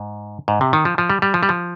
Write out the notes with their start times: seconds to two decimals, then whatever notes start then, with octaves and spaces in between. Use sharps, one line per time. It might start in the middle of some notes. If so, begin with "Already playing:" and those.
Already playing: G#2
0.48 G#2
0.61 C3
0.73 D#3
0.85 F3
0.98 F3
1.10 G3
1.22 G3
1.34 F3
1.43 G3
1.49 F3